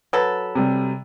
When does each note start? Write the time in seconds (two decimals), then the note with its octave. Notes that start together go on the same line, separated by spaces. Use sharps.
0.13 F#3 A4 B4
0.55 C3 G3